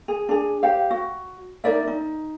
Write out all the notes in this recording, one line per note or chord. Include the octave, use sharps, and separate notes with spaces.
G#4
D4 G#4
G4 C5 F5
F#4
D#4 A#4 D5 E5
D#4